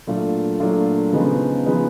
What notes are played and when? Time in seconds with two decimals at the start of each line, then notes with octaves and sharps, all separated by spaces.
0.07 A#2 F#3 A3 D4 F4
0.60 A#2 F#3 A3 D4 F4
1.13 C#3 F3 G#3 B3 D#4
1.65 C#3 F3 G#3 B3 D#4